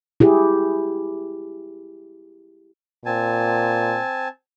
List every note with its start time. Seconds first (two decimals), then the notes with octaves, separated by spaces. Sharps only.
0.20 E4 G4 G#4
3.06 A#2 C4 G#5 A5